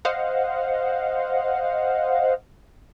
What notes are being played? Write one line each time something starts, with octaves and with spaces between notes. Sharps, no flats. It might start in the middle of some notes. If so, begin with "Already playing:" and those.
C5 D#5 F5 F#5